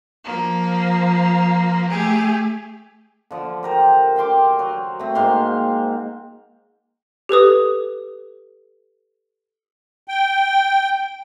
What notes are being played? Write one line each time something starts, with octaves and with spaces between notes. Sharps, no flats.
F3 A#3
A3 G4 G#4
D3 F3
G4 A#4 C5
F5 G5 C6 D6
F#3
A3 C4
G#2 A#3 F5 C6
G4 A4 B4 D#6
G5